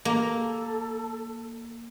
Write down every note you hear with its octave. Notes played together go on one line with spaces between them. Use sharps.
A#3 A4